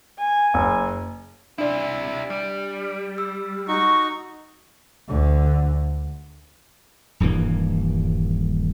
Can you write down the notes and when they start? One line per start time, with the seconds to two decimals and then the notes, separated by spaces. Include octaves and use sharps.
0.18 G#5
0.54 F#1
1.58 C3 D4 E4 D5
2.30 G3
3.18 E6
3.68 D#4 F#4 C#6
5.08 D2 D3
7.20 D#1 G2 E3 A#3